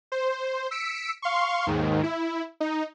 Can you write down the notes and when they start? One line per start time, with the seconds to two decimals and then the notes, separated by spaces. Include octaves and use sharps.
0.12 C5
0.71 E6 B6 C#7 D7
1.22 F5 C6 C#6
1.67 D#2 G#2 D#3
2.03 E4
2.60 D#4